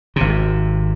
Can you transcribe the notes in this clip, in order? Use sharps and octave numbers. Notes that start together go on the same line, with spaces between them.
G#1 C3